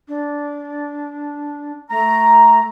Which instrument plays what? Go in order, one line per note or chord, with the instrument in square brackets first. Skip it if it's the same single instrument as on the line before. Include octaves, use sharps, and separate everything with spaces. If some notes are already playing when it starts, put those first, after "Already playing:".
[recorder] D4
[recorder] A3 [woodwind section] A#5